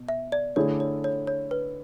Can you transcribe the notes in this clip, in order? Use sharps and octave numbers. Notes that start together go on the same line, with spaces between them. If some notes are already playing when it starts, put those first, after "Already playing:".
Already playing: B2
E5
D5
D3 A3 E4 G#4 C#5
C#5
C#5
C#5
B4